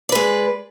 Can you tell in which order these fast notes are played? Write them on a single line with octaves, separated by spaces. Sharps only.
D5 B4 G#3